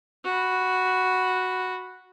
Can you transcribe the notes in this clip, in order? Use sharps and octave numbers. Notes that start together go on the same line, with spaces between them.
F#4 B5